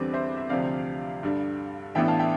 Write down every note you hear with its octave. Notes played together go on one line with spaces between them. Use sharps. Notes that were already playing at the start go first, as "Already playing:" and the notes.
Already playing: E2 D3 G3 C4 B4 D5
C5 E5
E5
D2 C3 F3 C4 D5 F5
G2 D3 G3 D4
A1 A2 E3 B3 D4 E5 G5
F5 A5
E5 G5